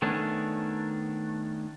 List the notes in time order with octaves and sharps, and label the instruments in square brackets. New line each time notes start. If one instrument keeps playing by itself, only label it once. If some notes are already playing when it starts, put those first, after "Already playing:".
[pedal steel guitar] D#3 A3 B3 C#4 D4